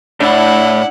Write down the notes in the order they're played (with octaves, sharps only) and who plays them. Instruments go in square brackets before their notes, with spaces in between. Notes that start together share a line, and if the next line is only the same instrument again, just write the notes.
[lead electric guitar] A2 [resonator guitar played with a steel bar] D4 [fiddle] E4 F#5